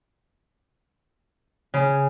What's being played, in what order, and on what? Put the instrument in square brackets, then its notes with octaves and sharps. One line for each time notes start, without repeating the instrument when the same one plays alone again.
[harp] C#3